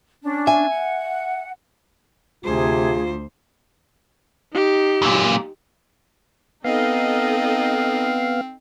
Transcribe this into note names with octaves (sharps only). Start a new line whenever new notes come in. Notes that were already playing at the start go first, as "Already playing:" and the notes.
C#4 D4
E5 G#5
F#5
D2 C3 F4 G#4 C5
D#4 G4
F#2 A#2
B3 C4 D#4 A4 D#5 F5